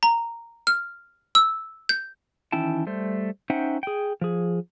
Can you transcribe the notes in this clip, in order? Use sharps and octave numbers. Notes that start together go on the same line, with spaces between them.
A#5
F6
E6
G6
D#3 E3 C#4 E4 G5 A5
G3 A3 C5
C#4 D#4 C5 E5 F#5 G5
G#4 G5
F3 G#4